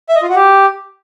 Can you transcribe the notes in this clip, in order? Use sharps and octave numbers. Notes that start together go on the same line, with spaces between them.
E5
D#5
F4
F#4
G4